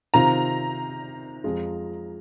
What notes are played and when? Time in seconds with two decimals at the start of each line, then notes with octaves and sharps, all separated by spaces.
0.14 C3 D#3 C4 F4 A#5
1.44 F2 F3 G#3 F4 G#4